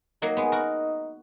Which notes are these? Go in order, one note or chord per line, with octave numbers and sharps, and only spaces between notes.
F#3 A#3 D#4
G#3 B3
F#4 A#4